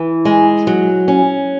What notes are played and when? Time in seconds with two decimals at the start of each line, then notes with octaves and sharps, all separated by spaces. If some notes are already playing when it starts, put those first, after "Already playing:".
Already playing: E3
0.25 G#3
0.67 F#3
1.08 C#4